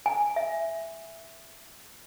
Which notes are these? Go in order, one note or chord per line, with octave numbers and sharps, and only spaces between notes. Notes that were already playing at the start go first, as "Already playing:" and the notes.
G#5
E5